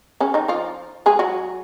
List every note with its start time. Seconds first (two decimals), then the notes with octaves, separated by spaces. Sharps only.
0.20 C#3 C#4
0.34 D#3 D#4
0.48 F3 F4
1.06 G#3 G#4
1.19 F#3 F#4